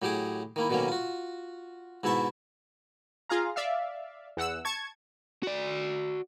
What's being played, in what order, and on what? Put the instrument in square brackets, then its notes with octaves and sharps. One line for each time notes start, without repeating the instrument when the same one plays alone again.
[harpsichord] A2 F#3 G4 G#4 D6 D#6
D#3 A#3 E4
B2 D3 D#3 F#3 A#3 C#4
F4 F#4
G#2 B2 E4 E5 A5 C#6
[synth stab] F4 G#4 F5 A#5
D5 E5 F5
E2 F#5 E6
A5 C#6 G#6
[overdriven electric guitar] F#4 D5